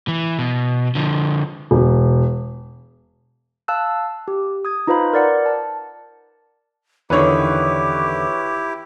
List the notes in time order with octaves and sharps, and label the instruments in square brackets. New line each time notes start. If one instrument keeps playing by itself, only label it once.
[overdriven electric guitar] E3
B2
D3 F3
[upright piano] E1
[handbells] F5 A5 E6 F#6
G4
D#6 G#6
D#4 F4 B4 C5 F5 B5
A#4 D5 F#5
A5
[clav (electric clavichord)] E2 D3 D#3 [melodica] E4 G4 [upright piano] B4 C#5 [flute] D6